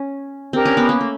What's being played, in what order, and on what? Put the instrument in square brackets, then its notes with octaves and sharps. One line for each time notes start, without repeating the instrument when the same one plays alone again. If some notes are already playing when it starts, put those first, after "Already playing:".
Already playing: [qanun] C#4
[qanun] C4 [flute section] D4 G4 A#4
[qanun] C#4
B3
A#3
A3